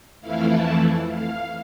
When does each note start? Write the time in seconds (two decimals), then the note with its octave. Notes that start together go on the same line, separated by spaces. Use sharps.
0.21 F2 E3 A3 E4 F5
0.51 A5
1.11 F5